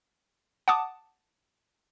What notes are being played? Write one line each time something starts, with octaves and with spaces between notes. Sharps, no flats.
F#5 A5 D6 D#6